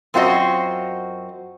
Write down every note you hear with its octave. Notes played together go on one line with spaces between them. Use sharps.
F#2 C4 F4 F#4 D#5